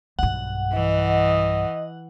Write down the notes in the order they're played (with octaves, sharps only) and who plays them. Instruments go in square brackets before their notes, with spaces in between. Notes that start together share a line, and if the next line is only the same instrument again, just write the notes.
[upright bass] B1 G2 [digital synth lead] F#5
[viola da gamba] E3 [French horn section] D#5